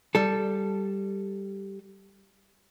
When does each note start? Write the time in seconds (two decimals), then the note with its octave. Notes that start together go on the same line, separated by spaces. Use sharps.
0.15 G3 A4